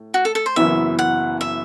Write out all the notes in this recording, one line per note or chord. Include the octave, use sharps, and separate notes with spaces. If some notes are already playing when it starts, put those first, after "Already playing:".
Already playing: A2
F#4
A4
A4
C5
F#1 F#2 E3 B3 E4 E5
F#5
E5